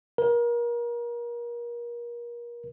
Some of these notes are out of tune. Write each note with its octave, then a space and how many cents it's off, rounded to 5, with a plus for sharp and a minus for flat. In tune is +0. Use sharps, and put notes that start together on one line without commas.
A#4 +30